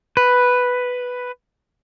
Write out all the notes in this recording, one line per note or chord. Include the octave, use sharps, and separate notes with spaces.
B4